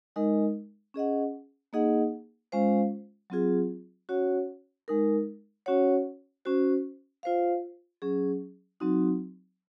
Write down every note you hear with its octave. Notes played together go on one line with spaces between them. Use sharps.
G#3 D#4 A#4 D#5
C#4 G#4 D#5 F#5
A#3 D#4 G#4 D#5 F#5
G#3 C#4 F4 C5 F5
F#3 C4 F4 G#4
C#4 F#4 C#5 F#5
G#3 D#4 A#4
C#4 F#4 C#5 F#5
C#4 F#4 C5
F4 C5 F5
F#3 C#4 G#4
F#3 C4 D#4 F#4